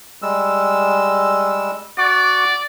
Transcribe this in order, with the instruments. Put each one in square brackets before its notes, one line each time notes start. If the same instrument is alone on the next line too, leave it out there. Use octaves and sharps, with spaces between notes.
[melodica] G3 G#3 E6
[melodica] F#4 F#5 D6 [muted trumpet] D5